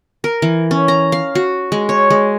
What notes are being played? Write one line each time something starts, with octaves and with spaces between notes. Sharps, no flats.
A#4
E3
C#4
A#5
F5
F#4
G#3
C#5
G#3